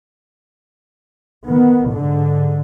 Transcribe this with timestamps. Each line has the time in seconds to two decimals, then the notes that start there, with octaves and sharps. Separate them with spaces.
1.47 D#3 B3
1.91 G#2 D3